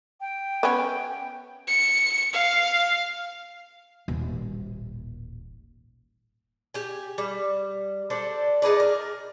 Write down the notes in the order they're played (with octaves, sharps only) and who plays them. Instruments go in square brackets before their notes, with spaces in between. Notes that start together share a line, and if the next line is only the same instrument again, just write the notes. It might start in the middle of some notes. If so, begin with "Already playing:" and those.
[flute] G5
[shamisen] B3 C#4
[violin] C#7
F5
[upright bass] D#1 A1
[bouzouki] G4 G#5
G3
D4 A4 C5 D5
D#4 G#4 B4 D5
A#4